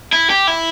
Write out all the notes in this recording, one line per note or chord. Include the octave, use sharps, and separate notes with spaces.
E4
G4
E4